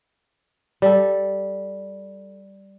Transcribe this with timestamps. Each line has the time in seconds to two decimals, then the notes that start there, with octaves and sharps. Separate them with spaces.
0.82 G3 A4